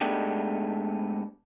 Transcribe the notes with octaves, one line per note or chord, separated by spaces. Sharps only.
G#2 G#3 A3 B3 D4 G4